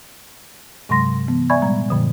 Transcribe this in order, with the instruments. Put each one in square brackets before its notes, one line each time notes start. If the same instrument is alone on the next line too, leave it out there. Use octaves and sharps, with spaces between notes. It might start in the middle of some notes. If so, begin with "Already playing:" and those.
[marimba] G2 C3 F#3 G#3 C6 A#6
E3 B3
D5 E5 G#5 B5 C#6 G#6
A#2 G3 G#3 A#5
F#2 A#2 D3 F3